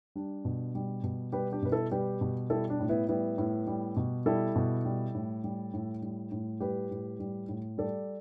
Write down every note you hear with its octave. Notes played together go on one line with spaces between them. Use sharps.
G3 D4
B2
G3
B2
G3 G4 B4
D4 G4
B2 B4
E4 A4
G3 G4 B4
B2
G3 E4 A4
D4
A2
B3 E4
G3 B3 E4
A2
G3
B2
G3 E4 A4
B2
G3
A2
G3
A2
G3
A2
G3 G4 B4
A2
G3
A2
G3 A4 D5